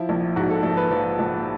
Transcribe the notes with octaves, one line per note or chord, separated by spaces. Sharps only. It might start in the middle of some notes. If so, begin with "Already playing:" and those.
Already playing: F3 E4
A#1
G#2 F#4
A4
A#1 A4
B4
F3
A#1